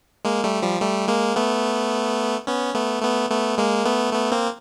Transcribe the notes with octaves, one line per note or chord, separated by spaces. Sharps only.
G#3 A#3
G3 A3
F3 G3
G3 A3
G#3 A#3
A3 B3
B3 C#4
A3 B3
A3 B3
A3 B3
G#3 A#3
A3 B3
A3 B3
A#3 C4